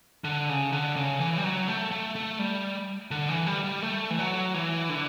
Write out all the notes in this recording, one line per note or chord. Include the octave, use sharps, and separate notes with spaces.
D3
C#3
D3
C#3
E3
G3
F#3
A3
A3
A3
G3
D3
E3
G3
G3
A3
E3
F#3
E3
D3